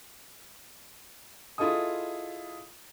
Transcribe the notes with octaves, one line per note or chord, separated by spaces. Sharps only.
E4 F4 G#4 A4 D#5 D#6